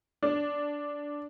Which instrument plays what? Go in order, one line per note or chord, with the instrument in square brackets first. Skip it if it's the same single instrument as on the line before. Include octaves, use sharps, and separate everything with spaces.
[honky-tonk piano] D4